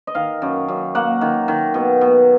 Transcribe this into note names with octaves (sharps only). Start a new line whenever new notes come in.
D#5
D#3 F5
F#2
F#2
A#3 F#5
D#3
D#3
B2
B2